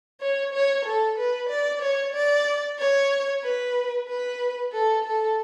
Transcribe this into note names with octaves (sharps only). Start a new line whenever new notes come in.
C#5
C#5
A4
B4
D5
C#5
D5
C#5
B4
B4
A4
A4